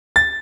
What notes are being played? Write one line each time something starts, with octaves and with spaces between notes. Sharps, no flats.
A6